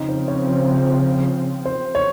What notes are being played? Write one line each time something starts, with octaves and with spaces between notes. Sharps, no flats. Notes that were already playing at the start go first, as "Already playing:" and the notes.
Already playing: C#3 F3 C4 D#4
C5
C#5
C5
C5
C#5